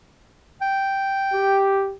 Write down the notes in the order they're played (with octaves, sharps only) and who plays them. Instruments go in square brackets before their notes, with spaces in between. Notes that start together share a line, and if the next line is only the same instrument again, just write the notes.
[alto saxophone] G5
[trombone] G4